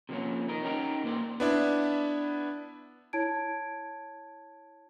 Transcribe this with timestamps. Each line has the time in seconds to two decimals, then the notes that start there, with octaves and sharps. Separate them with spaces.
0.09 C3 F3 G3 A#3 C#4
0.48 D#4 A#4 D#5
0.62 C#4 D#4 G4 A#4
1.04 A#2 A#3 C4 E4 C5 D5
1.40 B3 D4 E4
3.13 E4 C#5 A5 G#6 D7